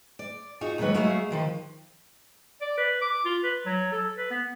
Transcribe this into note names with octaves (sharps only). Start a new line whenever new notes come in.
D5
D#4 F4 F#4 G#4
D#2 D3 F#3 G#3 B4 C#5
F#3 G#3 A3 F#4 G#4 F5
D3 D#3 F3
D5
B4
D6
F4
B4
F#3
A4
B4
B3